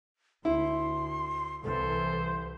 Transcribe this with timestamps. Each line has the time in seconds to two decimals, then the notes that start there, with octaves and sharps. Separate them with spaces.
0.45 D2 E4 C6
1.63 C2 E3 A4 C5